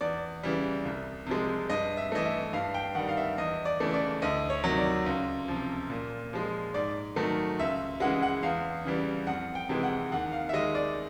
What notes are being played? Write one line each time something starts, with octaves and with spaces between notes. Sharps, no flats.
E2 D5
C#3 E3 G3
C2
C3 F3 G#3
G2 D#5
E5
E3 A3 D#5
E5
G2 F5
G5
D#3 G3 F#5
F5
E5
E2 D#5
D5
C#3 E3 A3
D5
D2 D#5
C#5
C3 D#3 F#3
D5
C#2
C3 F3
A#2
F3 G#3
G#2 D5
D#3 F#3 A3
C#2 E5
C#3 E3 G#3 F#5
F#5
E2 F5
C#3 E3 G3
F2 F#5
G5
C3 E3 G#3
F#5
D#2 F#5
F5
E5
D#3 G#3 D#5
D5